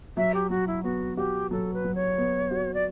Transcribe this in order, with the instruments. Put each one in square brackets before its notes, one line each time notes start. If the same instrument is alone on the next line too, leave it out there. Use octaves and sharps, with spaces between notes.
[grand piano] F#3 [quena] E5
[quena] G4
[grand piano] F#3 [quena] F#4
[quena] E4
[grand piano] B3 [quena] F#4
[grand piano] F#4 [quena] G4
[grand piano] F#3 [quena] A4
[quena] B4
[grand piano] F#3
[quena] C#5
[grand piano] B3
F#4
[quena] D5